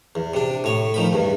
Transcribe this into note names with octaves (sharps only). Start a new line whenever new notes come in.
E2
C3 D4
A2 C#5
D#3 F3 B5
E2 G2